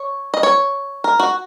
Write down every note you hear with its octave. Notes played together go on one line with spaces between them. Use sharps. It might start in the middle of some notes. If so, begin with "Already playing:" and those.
Already playing: C#5
D#5
C#5
A#4
F#4